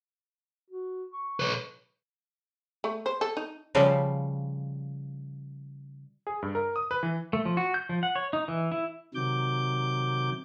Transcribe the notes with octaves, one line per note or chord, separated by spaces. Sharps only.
F#4
C#6
B4 C#5
A3
C5
A4
D#4
C#3 F3 G3
G#4
G2
A#4
D#6
B4
E3
A3
F3
F#4
G6
F3
F#5
C#5
D#4
E3
E4
C3 D#3 F#3 D6 G6